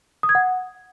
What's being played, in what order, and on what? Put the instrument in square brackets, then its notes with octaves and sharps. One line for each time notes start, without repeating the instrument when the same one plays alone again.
[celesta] D#6
G#6
F#5